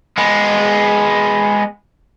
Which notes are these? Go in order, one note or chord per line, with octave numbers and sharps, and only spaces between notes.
G#3 B3